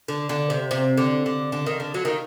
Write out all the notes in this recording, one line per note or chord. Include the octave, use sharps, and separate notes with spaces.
D3
D3
C3
C3
D3
D3
D3
D#3
D3
F#3
D#3